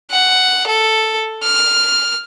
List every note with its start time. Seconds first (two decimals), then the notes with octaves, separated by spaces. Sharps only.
0.11 F#5
0.68 A4
1.43 F6